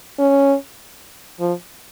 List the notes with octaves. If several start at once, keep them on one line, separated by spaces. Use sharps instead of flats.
C#4
F3